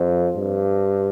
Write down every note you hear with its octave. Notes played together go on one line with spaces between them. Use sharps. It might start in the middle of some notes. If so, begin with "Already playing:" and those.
Already playing: F2
G2